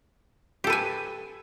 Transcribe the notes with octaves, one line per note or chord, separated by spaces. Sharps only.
G4 A4 B4 G#5